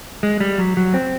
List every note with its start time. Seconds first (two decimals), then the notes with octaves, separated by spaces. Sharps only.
0.23 G#3
0.40 G3
0.58 F#3
0.77 F#3
0.94 C4